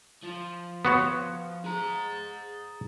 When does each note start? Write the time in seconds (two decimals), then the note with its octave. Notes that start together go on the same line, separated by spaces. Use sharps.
0.23 F3
0.85 B3 F#4 C#5
1.65 G#4 A#5